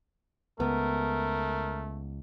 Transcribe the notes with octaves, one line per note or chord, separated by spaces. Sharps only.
C#2 A3 B3 A#4